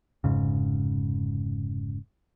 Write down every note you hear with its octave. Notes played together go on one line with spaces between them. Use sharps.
F1 A#1 G#2 C#3